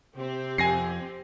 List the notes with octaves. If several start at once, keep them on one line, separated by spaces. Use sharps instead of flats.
C3 C4 G4
F2 G#5 A#6 C7